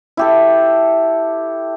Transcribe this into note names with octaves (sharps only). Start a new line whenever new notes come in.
E4 G4 A4